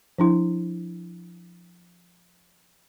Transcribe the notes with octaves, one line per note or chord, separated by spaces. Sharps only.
F3 D4 E4